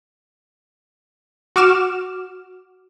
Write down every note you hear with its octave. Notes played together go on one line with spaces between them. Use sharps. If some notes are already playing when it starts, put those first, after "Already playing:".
F#4 D6 F6 E7